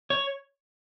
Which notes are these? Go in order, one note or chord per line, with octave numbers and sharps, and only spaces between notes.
C#5